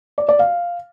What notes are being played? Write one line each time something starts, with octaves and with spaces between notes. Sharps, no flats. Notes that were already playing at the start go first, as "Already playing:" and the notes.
D5
D5
F5